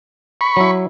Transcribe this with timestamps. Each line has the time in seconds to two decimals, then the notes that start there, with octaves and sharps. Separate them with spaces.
0.41 B5 C#6
0.57 F#3 E4